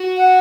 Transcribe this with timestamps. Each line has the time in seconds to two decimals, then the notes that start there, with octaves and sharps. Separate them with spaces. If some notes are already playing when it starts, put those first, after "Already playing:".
Already playing: F#4
0.17 F#5